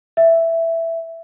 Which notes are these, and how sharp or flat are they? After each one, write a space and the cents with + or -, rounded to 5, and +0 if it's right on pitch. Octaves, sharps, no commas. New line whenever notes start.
E5 +5